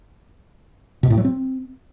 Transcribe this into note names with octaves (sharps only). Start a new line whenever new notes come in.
B2
A2
F#3
C4